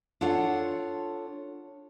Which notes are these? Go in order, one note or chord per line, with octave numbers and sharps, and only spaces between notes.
D4 F4 A4 C#5 F#5